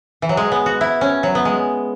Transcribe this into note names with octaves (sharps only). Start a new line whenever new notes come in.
E3
F#3
G#3
B3
F#4
E4
C#4
F#3
B3
G#3